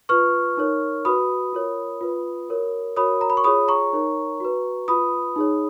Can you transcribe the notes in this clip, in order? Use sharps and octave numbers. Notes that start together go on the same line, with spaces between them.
F4 B4 C#6 F6
D#4 A#4 C#5
F#4 B4 B5 D#6
F4 A#4 C#5
F4 B4
F#4 A#4 C#5
F#4 A#4 C#5 B5 D#6
A#5
B5
C#6
F4 G#4 C#5 B5 D#6
A#5 C#6
D#4 A#4 C#5
F#4 B4
F4 B4 B5 D#6
D#4 G#4 C#5